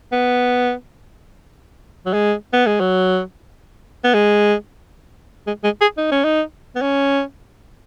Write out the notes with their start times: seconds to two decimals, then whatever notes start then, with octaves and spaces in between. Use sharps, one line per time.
0.12 B3
2.06 F#3
2.13 G#3
2.53 B3
2.67 G#3
2.80 F#3
4.04 B3
4.14 G#3
5.47 G#3
5.64 G#3
5.81 G#4
5.98 D#4
6.12 C#4
6.24 D#4
6.76 B3
6.81 C#4